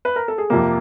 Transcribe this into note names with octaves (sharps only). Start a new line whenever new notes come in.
B4
A#4
A4
G#4
F2 C3 F3 A#3 G4